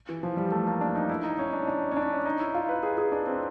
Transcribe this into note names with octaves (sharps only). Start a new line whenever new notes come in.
E3
F3
G3
A3
A#3
D4
D#4
E4
D#4
C#4
D4
D4
C#4
D4
D#4
E4
F4
B4
G#4
G#4
D4
C4